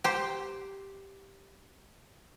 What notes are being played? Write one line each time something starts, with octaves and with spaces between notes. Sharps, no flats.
G4 C5